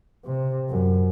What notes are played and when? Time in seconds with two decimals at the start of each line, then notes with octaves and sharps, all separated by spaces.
0.25 C3
0.70 F#2